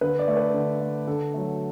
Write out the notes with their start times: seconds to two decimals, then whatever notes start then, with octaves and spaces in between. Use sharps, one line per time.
0.01 D3 B4
0.19 D5
0.28 A3
0.37 B4
0.54 D3
0.81 A3
1.07 D3 A4
1.34 F#3 A3